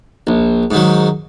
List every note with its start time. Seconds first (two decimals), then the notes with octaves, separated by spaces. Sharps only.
0.27 A#1
0.71 G#2 D#3 F#3